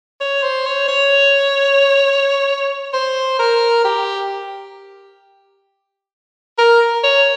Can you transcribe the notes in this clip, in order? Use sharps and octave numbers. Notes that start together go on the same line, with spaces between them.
C#5
C5
C#5
C#5
C5
A#4
G4
A#4
C#5